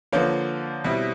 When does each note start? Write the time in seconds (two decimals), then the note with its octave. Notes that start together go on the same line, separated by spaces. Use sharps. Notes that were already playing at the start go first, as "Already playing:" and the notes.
0.12 D3 F3 A#3 B4 C#5
0.84 B2 G3 C4 E4